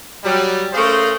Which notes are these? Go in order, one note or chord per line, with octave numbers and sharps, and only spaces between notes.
F#3 G3
A3 C#4 G#4 A#4 C5 F5